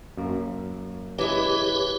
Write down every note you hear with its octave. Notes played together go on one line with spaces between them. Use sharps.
F#2 A#3
E3 G#3 G4 B4 C#5